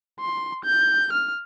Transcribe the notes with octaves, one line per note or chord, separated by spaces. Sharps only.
C6
G6
F6